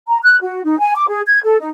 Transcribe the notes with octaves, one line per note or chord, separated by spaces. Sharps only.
A#5
F#6
F#4
D#4
G#5
D6
G#4
G#6
A4
D#4